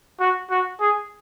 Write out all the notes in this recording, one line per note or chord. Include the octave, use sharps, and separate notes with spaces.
F#4
F#4
G#4